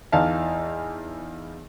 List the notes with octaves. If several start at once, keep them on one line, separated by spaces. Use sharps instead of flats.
E2 E3 D#4 F5 A5